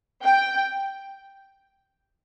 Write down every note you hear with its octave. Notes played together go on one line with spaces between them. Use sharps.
G5